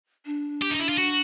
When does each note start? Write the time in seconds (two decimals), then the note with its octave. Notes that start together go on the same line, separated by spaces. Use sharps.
0.26 D4
0.62 G4
0.71 D#4
0.80 E4
0.89 F4
0.98 F#4